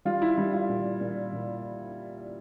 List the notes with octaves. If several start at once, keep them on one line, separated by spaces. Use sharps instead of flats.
G3 F4
E4
G3 E4
F4
A#2
A#2
A#2